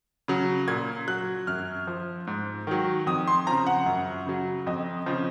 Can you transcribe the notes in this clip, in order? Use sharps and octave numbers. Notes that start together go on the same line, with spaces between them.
C#3 F#3
A#2 G#6
F#3 F#6
F#2 F6
F3
G#2
D#3 F#3
F2 D#6
C6
C#3 F3 A#5
F#5
F#2
C#3 F#3
F2 D#5
C#3 F3